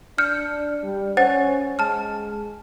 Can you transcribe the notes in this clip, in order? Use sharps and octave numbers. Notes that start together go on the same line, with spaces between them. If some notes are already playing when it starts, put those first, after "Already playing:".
D4 F6 G6 C#7
G3
C#4 C5 F#5 A6
G#3 A5 F6